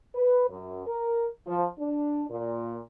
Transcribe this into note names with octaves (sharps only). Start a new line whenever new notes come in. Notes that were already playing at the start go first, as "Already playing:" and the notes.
B4
F#2
A#4
F3
D4
A#2